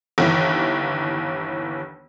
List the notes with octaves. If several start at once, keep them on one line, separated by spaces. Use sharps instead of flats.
G1 D#2 E3